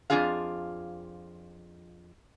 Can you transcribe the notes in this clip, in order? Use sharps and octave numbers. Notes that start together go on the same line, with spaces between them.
F2 F3 D4 F4 G#4 F5